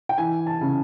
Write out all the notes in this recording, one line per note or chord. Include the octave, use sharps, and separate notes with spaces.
G5
E3 G#5
A5
C#3